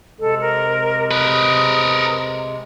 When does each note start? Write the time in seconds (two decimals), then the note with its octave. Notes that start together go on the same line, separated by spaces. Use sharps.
0.20 C3 G#3 A4
0.41 A#4
1.11 A#4 B4 D#6